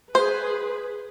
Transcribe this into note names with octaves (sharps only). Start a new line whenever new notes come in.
G#4 B4 C5